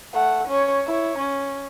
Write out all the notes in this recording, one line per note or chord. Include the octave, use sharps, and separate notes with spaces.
A3 F#5
C#4 C#5
E4 C#5
C#4